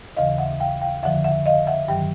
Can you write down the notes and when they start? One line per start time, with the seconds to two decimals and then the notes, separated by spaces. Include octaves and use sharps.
0.16 D#2 C#3 E3 D#5 F5
0.38 E5 F#5
0.60 F5 G5
0.81 F5 G5
1.03 F2 D3 F3 E5 F#5
1.24 E5 F#5
1.46 D#5 F5
1.67 E5 F#5
1.88 G2 D#3 F#3 G5